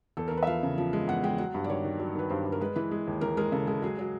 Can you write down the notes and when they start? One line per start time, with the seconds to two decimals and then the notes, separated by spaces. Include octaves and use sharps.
0.17 E2 A4
0.28 E2 A#4
0.37 B4
0.43 E5
0.47 F3 F5
0.63 C#3
0.78 F3
0.93 G#3
1.08 E2 F#5
1.23 G#3 G5
1.38 F#3 F#5
1.54 G2
1.64 D5
1.69 D#3 C#5
1.85 D#3
1.99 F#3
2.15 D#3 B4
2.30 G2 C5
2.46 G2
2.52 A#4
2.61 G#3 B4
2.76 E3 B4
2.91 G#3
3.07 D#2
3.21 E3 A#4
3.37 G#3 A#4
3.52 C#3 A4
3.67 G#3 A4
3.82 F#3 G#4
3.99 F#3